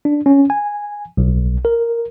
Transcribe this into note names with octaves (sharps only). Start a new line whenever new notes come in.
D4
C#4
G#5
B1
A#4